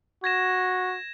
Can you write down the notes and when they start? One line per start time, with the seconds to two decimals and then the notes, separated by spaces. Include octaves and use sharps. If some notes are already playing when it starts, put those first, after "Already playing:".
0.24 F#4 G#6 A#6 E7